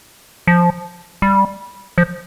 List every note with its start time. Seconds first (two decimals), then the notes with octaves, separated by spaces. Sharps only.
0.47 F3
1.22 G3
1.98 F3